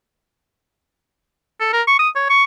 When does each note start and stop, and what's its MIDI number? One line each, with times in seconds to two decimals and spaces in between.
1.60 1.71 69
1.73 1.82 70
1.88 1.95 85
1.99 2.09 87
2.15 2.29 73
2.30 2.44 85